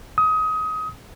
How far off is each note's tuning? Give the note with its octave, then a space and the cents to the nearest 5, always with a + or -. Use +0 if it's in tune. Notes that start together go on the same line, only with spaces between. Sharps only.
D#6 +25